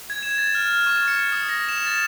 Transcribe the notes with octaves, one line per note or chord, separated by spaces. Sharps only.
G#6
E7
A6
F6
C#6
C#7
D#6
A#6
E7
A6